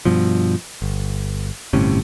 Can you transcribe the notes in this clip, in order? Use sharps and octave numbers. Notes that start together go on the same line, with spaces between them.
G2 B2 F3
G1
G1 A2 C3 C#4